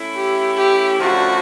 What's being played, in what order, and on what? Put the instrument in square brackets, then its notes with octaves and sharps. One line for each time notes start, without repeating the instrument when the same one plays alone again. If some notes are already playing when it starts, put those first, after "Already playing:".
Already playing: [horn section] A3 C#4 E4
[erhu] G4
G4
[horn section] F#2 D3 F3 A3 D4 [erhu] F#4